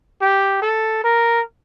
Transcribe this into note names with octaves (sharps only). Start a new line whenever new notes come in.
G4
A4
A#4